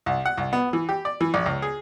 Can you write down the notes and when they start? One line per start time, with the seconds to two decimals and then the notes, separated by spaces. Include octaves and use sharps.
0.06 C2
0.26 F#5
0.37 C2
0.53 B3
0.73 E3
0.89 G4
1.05 D5
1.21 E3
1.34 A#1
1.46 C#2
1.62 G#4